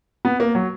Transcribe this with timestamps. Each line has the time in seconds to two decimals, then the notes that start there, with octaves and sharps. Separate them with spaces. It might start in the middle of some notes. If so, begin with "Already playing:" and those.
0.25 B3
0.40 A#3
0.55 F#3